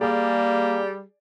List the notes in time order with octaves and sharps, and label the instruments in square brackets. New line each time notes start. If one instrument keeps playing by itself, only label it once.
[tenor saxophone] G3 [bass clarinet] A#3 [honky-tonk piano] G#4 D5